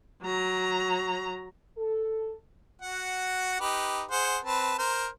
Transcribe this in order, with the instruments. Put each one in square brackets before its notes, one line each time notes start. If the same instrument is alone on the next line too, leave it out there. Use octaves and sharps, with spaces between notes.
[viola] F#3 A#5
[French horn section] A4
[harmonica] F#4 F#5
D#4 G4 B4
G#4 C5 F#5
C4 B4 A5
A#4 C5